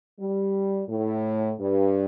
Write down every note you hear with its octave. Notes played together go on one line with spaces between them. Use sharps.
G3
A2
G2